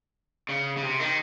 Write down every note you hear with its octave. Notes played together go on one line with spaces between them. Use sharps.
C#3
C#3
C3
D#3